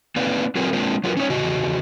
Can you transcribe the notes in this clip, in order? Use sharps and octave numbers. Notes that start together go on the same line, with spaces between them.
A#3 C4 D#4 B4 D5 F5
F#3 C4 F4 G#4 A#4 B4
G#3 A#3 C4 D4 F4
F#3 F4 G#4 A#4 B4
C#4 D#4 C#5
E2 C#3 F#4 D#5